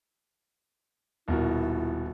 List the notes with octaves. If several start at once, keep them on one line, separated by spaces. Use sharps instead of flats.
D#1 B2 E4 A#4